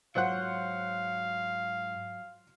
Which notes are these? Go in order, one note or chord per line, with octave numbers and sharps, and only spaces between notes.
G#2 F#3 F4 C5 F5 F#5